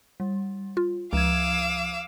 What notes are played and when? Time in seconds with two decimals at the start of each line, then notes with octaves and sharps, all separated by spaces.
0.20 G3
0.77 F4
1.13 C#2 F3 F5 D6 E6 G#6